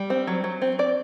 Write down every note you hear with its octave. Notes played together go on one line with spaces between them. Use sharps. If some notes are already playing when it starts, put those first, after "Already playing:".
Already playing: G3
C4
F#3
F#3
C4
C4 D5